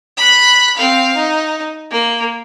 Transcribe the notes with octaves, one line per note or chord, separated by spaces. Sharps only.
B5 F#6
C4 F5
D#4
A#3